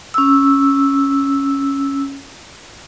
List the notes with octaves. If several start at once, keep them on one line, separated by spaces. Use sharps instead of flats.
C#4 E6